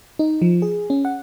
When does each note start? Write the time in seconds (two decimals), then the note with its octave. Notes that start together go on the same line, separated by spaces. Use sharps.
0.19 D#4
0.42 F3
0.62 G#4
0.90 C#4
1.05 F#5